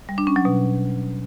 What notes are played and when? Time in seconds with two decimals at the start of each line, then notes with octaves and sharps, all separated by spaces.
0.09 G3
0.18 D4
0.27 C#4
0.36 F#3
0.45 B2